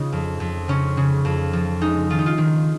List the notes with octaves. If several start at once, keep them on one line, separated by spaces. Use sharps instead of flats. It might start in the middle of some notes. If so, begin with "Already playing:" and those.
Already playing: C#3 D#4 F4
F2
F2
C#3 C#4
C#3
F2
F3
G#3 D#4
D#3 F4
D#4
F4
D#3